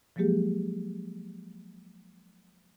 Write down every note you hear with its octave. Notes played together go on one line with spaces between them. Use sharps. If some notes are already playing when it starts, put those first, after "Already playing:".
F3 F#3 G#3 A#3 G4 G#4